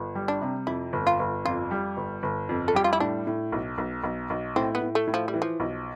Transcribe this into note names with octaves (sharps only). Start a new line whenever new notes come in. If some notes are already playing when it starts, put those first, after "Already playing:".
Already playing: G1
G3
D4
C3
F2 E4
G1
F4
G1
F2 F4
G3
G1
G1
F2
A4
G3 G4
F4
E4
A2 D4
A2
B1
B1
B1
B1
A2 C4
B3
A2
A3
A2
F3
G3
E3
F3
B1